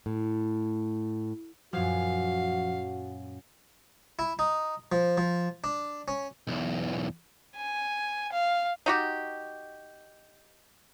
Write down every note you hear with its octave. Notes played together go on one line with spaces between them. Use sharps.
A2
F#2 A#2 F3 F#3 F#4 F5
E4
D#4
F3
F3
D4
C#4
B1 E2
G#5
F5
D#4 F#4 G4